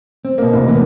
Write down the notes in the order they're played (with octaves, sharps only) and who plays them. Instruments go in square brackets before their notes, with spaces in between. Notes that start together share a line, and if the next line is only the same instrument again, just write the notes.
[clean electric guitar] C4
[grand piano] B2 A#3
F1
[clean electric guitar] E3 A#3 B3